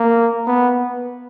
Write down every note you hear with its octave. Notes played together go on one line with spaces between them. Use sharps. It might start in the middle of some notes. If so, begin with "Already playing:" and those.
Already playing: A#3
B3